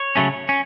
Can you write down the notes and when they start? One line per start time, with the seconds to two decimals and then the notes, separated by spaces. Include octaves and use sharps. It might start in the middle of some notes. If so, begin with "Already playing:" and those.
Already playing: C#5
0.16 C#3 F#3 A3 C#4
0.49 C#4